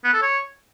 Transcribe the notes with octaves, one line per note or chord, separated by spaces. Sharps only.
B3
A4
C#5